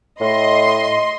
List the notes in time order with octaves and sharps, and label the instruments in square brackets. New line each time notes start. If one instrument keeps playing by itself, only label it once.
[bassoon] A2 [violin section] D#5 C6